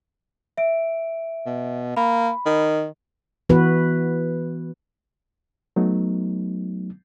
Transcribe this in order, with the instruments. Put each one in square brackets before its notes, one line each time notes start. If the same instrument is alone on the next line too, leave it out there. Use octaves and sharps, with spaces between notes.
[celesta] E5 D7
[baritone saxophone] B2
[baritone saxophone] A#3 [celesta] B5
[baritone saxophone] D#3
[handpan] E3 B3 F#4 B4
[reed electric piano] F#3 A3 B3 D#4